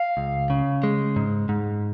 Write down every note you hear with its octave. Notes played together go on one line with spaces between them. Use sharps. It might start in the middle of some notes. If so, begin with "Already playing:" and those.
Already playing: F5
C#2
C#3
G#3
G#2
G#2